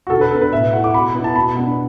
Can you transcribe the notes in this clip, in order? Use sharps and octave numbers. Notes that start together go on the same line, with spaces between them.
F#4
D3 A4
B4
B3 D4 A4
B4
A2 E5
A3 E4 F#5
D6
B2 B5
B3 E4
A5
B2 B5
B3 D4